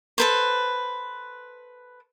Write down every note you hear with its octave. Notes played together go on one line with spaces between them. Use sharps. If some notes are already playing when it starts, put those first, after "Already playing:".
A4 B4 C5